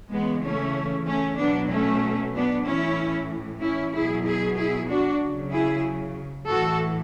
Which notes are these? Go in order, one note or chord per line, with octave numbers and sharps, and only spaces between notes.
C#3 E3 G#3 B3
A3 C#4
A3 C#4
B2 F#3 B3 D4
A3 C#4
B3 D4
A2 E3 C#4 E4
C#4 E4
B2 F#3 E4 G#4
E4 G#4
E4 G#4
D4 F#4
C#3 F#3
E4 G#4
A2 E3 F#4 A4